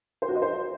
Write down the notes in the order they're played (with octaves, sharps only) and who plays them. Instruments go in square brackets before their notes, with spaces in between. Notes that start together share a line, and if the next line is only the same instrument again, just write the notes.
[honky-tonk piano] C5
F#4
D#5
C5